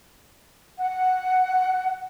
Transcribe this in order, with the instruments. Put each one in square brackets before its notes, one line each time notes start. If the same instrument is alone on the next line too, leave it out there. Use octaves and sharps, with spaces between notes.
[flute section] F#5